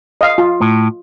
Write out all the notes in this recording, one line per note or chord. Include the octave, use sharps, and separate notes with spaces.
D#5 F5
F4
A2